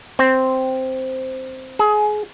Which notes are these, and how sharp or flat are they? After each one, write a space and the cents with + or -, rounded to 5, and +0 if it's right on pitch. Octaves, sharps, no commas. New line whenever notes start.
C4 -5
G#4 +25